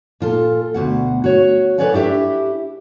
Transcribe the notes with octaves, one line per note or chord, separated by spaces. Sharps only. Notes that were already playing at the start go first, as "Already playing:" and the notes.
A#2 F4 A4
D2 B2 F#5
F#4 C#5
A4 B4 C#5 D5 F#5 G#5
D4 E4 G4 E5